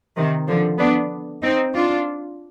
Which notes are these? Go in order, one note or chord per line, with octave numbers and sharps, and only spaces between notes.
C3 D#3
D3 F3
B3 D4
C4 D#4
D4 F4